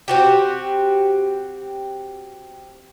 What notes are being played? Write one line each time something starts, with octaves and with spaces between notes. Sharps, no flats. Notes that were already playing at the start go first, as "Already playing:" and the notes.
C4 F#4 G4